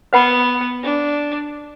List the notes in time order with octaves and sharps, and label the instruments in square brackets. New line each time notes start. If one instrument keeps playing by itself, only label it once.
[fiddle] B3 [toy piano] B4 F#5 B5
[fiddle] D4